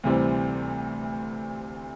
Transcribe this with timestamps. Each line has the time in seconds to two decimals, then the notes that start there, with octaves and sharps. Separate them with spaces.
0.03 D2 C3 E3 G3 C4